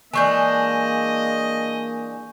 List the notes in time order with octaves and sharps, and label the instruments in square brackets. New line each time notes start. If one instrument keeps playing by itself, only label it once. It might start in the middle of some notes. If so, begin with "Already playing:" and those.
[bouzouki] E3 G#3 D4 [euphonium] A#3 [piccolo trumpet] D#5 [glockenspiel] G#5 C#6 G6